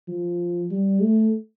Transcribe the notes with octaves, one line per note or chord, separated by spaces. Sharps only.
F3
G3
A3